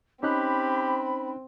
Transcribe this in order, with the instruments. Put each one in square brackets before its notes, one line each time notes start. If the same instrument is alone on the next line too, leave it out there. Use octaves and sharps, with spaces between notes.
[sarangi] C4 [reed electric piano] C#4 D#4 F#6 [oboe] G4 [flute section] B5